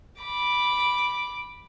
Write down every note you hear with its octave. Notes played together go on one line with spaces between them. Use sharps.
B5 D6